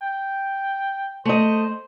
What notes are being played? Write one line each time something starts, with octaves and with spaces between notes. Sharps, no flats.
G5
A3 C5 D#5